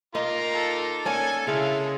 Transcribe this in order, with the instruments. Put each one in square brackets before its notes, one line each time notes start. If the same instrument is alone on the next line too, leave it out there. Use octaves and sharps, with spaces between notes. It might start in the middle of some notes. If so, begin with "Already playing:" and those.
[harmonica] A#3 F4 [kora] D#4 [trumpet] A#5
[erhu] A4
[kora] A#3 C#4 D4 [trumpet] G#5
[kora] C#3 [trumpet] G#3 [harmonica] E4 F5